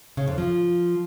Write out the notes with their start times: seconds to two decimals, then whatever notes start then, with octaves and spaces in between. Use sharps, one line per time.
0.17 C#3
0.28 F2
0.38 F3